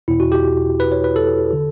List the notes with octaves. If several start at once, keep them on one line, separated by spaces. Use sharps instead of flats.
E2 B2 E4
F#4
G4
B4
C#5
B4
A4
D3